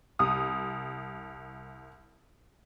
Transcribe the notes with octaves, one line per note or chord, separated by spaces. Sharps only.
C2 D#6